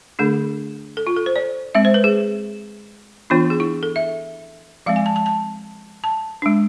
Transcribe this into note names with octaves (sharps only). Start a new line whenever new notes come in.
D3 A3 D4 G#4
A4
F4
A4
C5
D5
G#3 C4 E5
C5
B4
G#4
E3 B3 D4 F4
G#4
E4
A4
E5
F3 G#3 C4 F5
G#5
A5
A5
A5
A5
G#3 D4